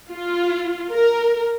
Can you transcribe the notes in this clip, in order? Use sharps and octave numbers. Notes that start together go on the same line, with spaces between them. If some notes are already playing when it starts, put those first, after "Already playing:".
F4
A#4